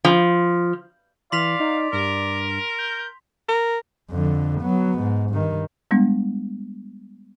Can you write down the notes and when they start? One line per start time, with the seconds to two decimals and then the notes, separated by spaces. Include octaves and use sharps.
0.05 F3
1.32 E3 D5 F5 C6 B6 F7
1.60 D#4
1.93 G2 A#4
2.78 G6
3.49 A#4
4.11 F2 D3
4.61 F#3 B3
4.99 G#2
5.31 G2 D#3
5.91 G3 G#3 B3 D4